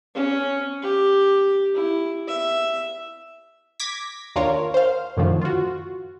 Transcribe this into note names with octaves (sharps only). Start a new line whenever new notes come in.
C#4
G4
E4
E5
D6 G#6 A#6 B6
D#2 D4 F4 A#4 C#5
C5 F5
F#2 A2 D3 D#3 F3
F4 F#4